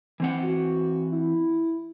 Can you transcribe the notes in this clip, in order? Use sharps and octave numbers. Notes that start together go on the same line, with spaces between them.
E3 C4 F#5
F#4
E4